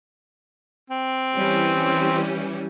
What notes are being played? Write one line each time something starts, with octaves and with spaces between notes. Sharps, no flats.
C4
E3 G3 C#4